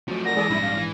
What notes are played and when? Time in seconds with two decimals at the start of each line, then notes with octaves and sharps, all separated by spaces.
0.08 F3 F#3 A3
0.25 A#4 D5 F#5 A#6
0.37 E3 G#3 G#4 A4 D5
0.49 A#1 F2 G#2 G3 E4 E6
0.63 F5
0.77 E3